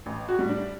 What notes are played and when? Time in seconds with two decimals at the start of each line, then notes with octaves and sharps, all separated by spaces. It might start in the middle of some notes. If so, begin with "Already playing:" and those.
0.06 A1
0.29 F#4
0.39 A2 G3
0.49 D4